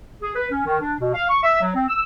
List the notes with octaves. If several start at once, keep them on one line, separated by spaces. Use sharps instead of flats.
G#4
B4
C#4
D#3
D4
B2
F5
C#6
E5
F#3
C4
E6